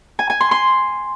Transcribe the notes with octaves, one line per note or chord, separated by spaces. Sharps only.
G#5
G#5
C6
C6